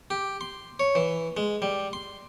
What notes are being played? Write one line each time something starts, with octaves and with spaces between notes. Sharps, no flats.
G4
C6
C#5
E3
G#3
G3
C6